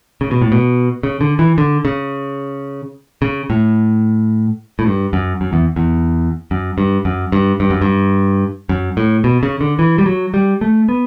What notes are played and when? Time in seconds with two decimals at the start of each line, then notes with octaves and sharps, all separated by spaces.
0.21 C#3
0.31 B2
0.42 A2
0.52 B2
1.03 C#3
1.21 D3
1.39 E3
1.58 D3
1.85 C#3
3.22 C#3
3.50 A2
4.79 A2
4.86 G2
5.13 F#2
5.41 F#2
5.53 E2
5.76 E2
6.51 F#2
6.78 G2
7.05 F#2
7.32 G2
7.60 G2
7.70 F#2
7.81 G2
8.69 F#2
8.97 A2
9.24 B2
9.43 C#3
9.61 D3
9.79 E3
9.98 G3
10.06 F#3
10.34 G3
10.61 A3
10.89 B3